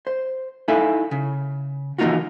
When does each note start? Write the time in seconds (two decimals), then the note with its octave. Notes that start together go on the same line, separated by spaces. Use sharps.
0.07 C5
0.68 D#4 E4 A4 E5 F5 G#5
1.11 C#3
1.98 E3 F3 A#3 D#4 F4 F#4